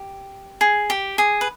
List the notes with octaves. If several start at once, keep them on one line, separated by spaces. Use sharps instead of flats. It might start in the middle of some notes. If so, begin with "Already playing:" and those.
Already playing: G4
G#4
G4
G#4
B4